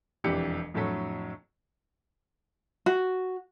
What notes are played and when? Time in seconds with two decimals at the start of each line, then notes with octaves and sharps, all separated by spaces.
0.24 E1 F2 E3 D4 G4 C#7
0.74 F2 A2 D3 F#3 A4 B6
2.86 F#4